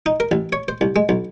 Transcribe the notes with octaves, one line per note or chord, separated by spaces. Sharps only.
D#4
A#4
A1
C#5
C5
C2
G#3
B1